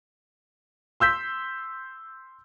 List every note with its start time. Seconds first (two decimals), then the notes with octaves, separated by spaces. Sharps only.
1.00 C6 E6 G6 B6